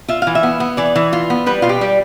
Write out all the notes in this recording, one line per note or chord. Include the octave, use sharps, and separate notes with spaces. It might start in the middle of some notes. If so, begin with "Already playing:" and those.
F4 E5
E3 F5
E5
B3
B3
E3 D5
E3
F4
B3
G3 B4
B2 F4
G4
G3